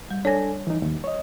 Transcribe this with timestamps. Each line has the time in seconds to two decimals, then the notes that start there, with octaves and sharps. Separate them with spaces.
0.11 G3
0.25 D4 A4 C#5 G#5 A#6
0.67 E3 D#4
0.82 D#2
1.04 C#5 D#5